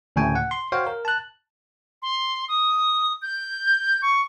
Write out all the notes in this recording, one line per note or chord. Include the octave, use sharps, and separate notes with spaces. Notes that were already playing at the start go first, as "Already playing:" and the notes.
D2 A2 C#3 G5 G#5
F#5
C6
F#4 C5 C#5 F5 G5
A#4
A5 F#6
C6
D#6
G6
C#6